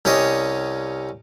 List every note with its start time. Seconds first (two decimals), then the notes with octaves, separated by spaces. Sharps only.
0.05 C2 C#4 G4 C#5 D#5